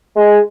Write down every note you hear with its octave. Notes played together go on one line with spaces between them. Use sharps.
G#3